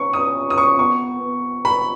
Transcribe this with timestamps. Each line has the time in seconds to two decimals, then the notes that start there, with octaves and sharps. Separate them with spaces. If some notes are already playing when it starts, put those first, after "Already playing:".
Already playing: C#4 C#6
0.13 D#6
0.50 D#6
0.58 C#6
0.79 B3 C#6
1.22 B3
1.65 B5